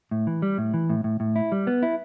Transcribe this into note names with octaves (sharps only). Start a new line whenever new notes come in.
A2
E3
G3
A2
E3
A2
A2
A2
E4
G3
B3
E4